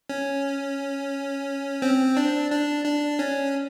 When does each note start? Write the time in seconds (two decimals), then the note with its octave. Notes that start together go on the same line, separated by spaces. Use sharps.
0.10 C#4
1.82 C4
2.17 D4
2.51 D4
2.85 D4
3.19 C#4